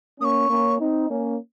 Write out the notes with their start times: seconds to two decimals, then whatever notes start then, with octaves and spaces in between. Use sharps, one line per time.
0.20 A#3 C#4 C#6 D#6
0.50 A#3 C#4
0.80 C4 D#4
1.10 A#3 C#4